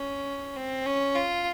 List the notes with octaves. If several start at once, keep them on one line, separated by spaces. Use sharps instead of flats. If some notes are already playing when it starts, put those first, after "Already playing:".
Already playing: C#4
C4
C#4
F4